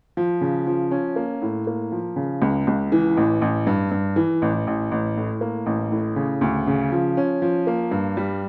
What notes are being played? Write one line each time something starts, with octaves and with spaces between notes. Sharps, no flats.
F3
C#3
F3
C#4
A#3
A2
A#3
F3
C#3
C#2
C#2
E3
A1
A1
G2
G2
E3
A1
A1
A1
A2
A#3
A1
A2
C#3
D2
C#3
F3
C#4
F3
A#3
G2
G3